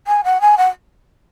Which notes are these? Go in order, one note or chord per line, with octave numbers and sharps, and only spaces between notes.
G#5
F#5
G#5
F#5